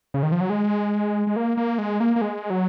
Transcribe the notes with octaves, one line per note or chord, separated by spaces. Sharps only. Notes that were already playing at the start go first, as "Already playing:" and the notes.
C#3
D#3
F3
F#3
G#3
G#3
A#3
A#3
G#3
A#3
A#3
G#3
F#3